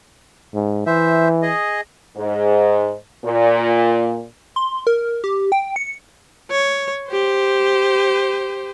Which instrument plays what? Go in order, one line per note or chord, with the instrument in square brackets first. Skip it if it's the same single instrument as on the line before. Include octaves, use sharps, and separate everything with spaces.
[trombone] G#2
[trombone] E3 [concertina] C5 E5
[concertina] G#4 D#5
[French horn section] G#2
A#2
[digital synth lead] C6
A#4
G4
G5
C#7
[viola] C#5
G4 C5